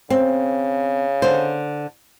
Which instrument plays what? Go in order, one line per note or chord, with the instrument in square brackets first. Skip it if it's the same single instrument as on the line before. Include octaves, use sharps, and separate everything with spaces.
[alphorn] C#3 [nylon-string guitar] C4
[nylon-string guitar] D3 C5